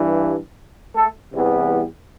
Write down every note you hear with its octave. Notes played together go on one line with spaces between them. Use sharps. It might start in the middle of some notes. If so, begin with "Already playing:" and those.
Already playing: G2 E3 G3
A3 A4
E2 C3 E3 G3 B3